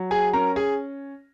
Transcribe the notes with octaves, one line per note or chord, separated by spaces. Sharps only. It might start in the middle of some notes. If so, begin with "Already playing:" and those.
Already playing: F#3
G#4 G#5
C#4 A#4 A#5
G#4 G#5